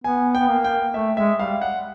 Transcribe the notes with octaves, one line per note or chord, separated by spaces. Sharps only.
B3 G#5
B3 G5
A#3
G5
A3 E5
G#3 E5
G3 F5
F#5